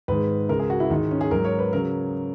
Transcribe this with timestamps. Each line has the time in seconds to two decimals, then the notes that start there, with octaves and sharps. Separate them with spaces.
0.08 G#2 D#3 G#3 B4
0.49 C#2 C#3 G#3 A#4
0.59 G#4
0.70 F#4
0.80 E4
0.90 G#2 D#3 G#3 D#4
1.11 C#4
1.21 G#4
1.31 G#2 F#3 A#4
1.45 C#5
1.59 B4
1.73 C#3 F#3 A#4